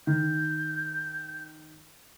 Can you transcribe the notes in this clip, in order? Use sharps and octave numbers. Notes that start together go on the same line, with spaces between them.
D#3 G6